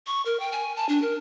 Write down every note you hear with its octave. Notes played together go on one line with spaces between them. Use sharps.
C#6
A#4
G5
G#5
A5
D4
A#4